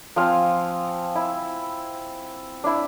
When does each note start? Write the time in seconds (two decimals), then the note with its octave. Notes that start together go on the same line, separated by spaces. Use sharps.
0.16 F3 C4 F5 G#5
1.15 E4
2.64 D4 E4